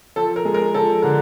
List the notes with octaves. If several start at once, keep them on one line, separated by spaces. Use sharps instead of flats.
F3 A4
A#4
G#3
A#4
F3 A4
D3 A#4